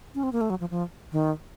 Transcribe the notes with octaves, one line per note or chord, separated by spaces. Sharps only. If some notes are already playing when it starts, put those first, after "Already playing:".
C#4
C4
A#3
A3
F#3
F3
F3
D#3